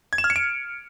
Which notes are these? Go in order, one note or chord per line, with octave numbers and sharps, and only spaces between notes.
G#6
E7
F6
C#7
D7